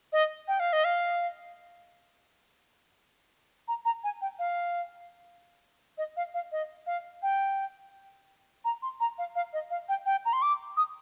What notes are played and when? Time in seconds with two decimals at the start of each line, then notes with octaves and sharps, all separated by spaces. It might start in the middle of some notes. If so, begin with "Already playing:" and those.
0.12 D#5
0.48 G5
0.60 F5
0.73 D#5
0.84 F5
3.68 A#5
3.85 A#5
4.04 G#5
4.21 G5
4.39 F5
5.98 D#5
6.17 F5
6.34 F5
6.52 D#5
6.87 F5
7.22 G5
8.65 A#5
8.82 C6
9.00 A#5
9.18 F5
9.35 F5
9.53 D#5
9.70 F5
9.89 G5
10.06 G5
10.25 A#5
10.33 C6
10.42 D6
10.77 D#6